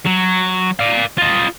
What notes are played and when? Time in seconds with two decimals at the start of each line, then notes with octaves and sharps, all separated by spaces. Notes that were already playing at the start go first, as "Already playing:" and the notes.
0.06 F#3
0.79 D5 F5
1.18 F4 D#5